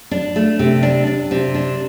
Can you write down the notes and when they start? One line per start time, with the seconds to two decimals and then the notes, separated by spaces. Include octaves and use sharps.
0.11 D4
0.36 A3
0.59 C3
0.83 D4
1.07 D4
1.31 C3
1.55 D4